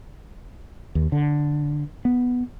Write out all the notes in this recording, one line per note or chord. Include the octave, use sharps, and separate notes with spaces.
D#2
D3
B3